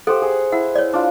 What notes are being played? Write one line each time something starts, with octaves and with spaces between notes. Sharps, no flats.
G4 A4 C5 F#5
G#4
E4 F#5
C#5 D5
D4 F4